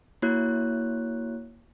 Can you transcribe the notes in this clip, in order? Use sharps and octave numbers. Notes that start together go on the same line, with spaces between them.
A#3 E4 F#4 C#5 F#6